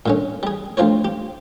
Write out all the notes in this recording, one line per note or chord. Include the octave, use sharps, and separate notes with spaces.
A#2 D3 C#4
G3 G#4
D2 F3 F4 C5 C#5
G4